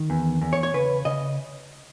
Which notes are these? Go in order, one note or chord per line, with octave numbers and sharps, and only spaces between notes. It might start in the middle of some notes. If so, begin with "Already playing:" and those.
Already playing: D#3
E2
E2
C#5
C#5
C#3 B4
C#3 D#5